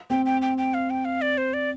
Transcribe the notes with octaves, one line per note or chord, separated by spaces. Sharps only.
C4 G5
G5
G5
G5
F5
G5
F5
D5
C5
D5